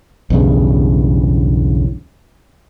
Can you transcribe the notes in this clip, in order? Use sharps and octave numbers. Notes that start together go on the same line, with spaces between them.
B1 E2 G2 C#3